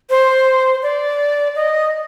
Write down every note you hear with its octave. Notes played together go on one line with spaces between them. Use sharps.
C5
D5
D#5